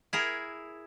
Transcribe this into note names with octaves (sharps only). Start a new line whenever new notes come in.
E4 G#4 A#4